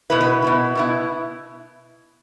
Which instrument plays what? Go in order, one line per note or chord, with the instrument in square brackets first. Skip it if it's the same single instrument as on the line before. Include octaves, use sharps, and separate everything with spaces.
[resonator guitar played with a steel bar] B2 B3 E4 B4
B4
B2 B3 E4
B2 B3 E4